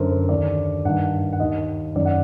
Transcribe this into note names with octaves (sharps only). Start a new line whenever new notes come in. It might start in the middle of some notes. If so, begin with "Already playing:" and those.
Already playing: F#2 D3 A#4 C5
C5
D#2 D3 D5
G2 D#3 F#5
F#5
D#2 D#3 D#5
F#2 D#3 D5
F#5